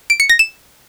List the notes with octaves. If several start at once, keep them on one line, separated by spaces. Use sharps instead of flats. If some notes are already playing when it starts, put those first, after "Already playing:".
D7
C#7
A#6
E7